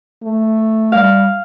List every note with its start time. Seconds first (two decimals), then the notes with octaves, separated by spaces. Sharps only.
0.24 A3
0.92 G3 F5